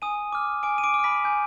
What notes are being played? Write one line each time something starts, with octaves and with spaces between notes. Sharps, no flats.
G#5 D#6 D#7
D6 F6
G#5 D6 D7
D#7
D6 D7
D6 F6
B5 B6
G#5 G6